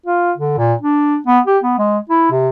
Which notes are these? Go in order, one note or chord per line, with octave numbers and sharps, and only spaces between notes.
F4
D3
A#2
D4
B3
G4
B3
G#3
E4
C3